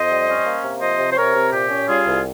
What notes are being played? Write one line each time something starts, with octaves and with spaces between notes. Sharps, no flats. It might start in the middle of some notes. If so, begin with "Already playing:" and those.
Already playing: F2 C5 D#5
G3
C#4
A#3
C3
F3 C5 D#5
C3
C5
C4 A#4 C#5
C3
A#2 G4
C#4
G3 F4 G#4
C2